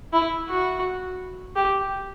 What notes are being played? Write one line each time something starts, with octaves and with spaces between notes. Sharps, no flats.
E4
F#4
G4